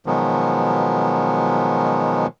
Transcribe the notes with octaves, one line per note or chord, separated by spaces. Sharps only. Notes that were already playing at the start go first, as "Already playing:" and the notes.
B2 D#3 F3 F#3 G#3 B3